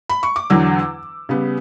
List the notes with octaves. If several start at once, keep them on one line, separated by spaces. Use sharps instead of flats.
B5
C#6
D6
E2 D3 F#3 E6
C#3 G3 B3